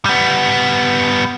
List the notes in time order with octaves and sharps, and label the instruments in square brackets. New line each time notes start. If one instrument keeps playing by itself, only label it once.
[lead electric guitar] G3 B3